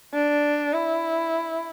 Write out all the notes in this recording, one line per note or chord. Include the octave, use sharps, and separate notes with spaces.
D4
E4